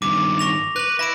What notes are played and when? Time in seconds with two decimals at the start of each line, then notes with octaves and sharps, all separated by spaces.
0.02 G2 D#3 D6
0.39 C#6 A#6 F7
0.76 B4 F#6 F#7
0.99 E5 B5 A#6 D7